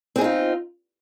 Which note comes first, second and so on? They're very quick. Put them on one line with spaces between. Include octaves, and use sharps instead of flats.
C4 G#4 D#4 F4